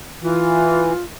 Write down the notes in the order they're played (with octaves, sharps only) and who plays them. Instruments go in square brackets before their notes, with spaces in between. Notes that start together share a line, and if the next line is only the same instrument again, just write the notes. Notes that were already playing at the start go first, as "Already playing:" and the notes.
[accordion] E3 [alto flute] F4